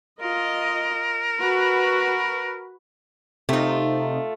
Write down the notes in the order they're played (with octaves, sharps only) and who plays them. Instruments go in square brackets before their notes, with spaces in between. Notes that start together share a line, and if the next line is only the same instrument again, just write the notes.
[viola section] F4 D#5 [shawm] A#4
[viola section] F#4 B4 B5
[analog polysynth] C3 D#4 [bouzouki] A3 F4